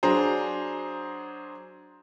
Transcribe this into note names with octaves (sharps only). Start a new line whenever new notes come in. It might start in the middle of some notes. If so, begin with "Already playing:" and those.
F#3 D4 G#4 C5 A#5